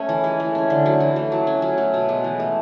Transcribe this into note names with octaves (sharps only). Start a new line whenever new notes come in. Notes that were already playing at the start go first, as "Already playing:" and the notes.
Already playing: A3 C#4
E3
G#3
A3
C#4
D3
F#3
E3
A3
F#3
C#4
F#3
A3
B2
G#3
E3
A3